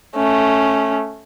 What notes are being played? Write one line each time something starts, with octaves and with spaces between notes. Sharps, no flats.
A3 C#4